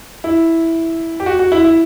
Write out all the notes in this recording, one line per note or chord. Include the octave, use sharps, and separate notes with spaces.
E4
G4
F#4
F#4
E4
E4